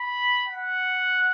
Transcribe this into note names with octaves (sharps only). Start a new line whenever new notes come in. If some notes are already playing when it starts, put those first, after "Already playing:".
Already playing: B5
F#5